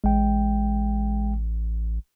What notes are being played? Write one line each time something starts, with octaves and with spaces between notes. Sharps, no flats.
A1 G#3 G5